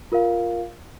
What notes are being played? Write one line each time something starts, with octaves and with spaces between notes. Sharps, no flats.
F4 A#4 F5